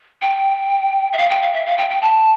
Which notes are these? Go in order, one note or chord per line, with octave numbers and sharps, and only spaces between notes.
G5
E5
F5
G5
F5
E5
F5
G5
G5
A5